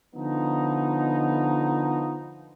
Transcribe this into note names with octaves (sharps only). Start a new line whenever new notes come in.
D3 F3 B3 D#4